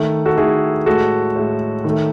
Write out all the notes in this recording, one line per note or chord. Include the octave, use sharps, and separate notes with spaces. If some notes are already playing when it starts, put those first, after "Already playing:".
Already playing: D#3 A3
F#4 A4
D#3 A3 E4 G#4
A2 G#3 F#4 A4
A2 G#3
D#3
A3